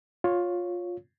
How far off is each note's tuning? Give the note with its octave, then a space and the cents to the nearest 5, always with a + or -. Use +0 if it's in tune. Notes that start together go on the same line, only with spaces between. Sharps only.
F4 +15 C#5 +0